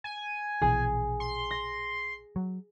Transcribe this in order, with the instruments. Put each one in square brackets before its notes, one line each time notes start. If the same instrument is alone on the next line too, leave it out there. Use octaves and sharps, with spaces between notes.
[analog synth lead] G#5
[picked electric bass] A#1 B2 E3 [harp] G#4
[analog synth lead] C6
[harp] A#6
[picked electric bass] F#3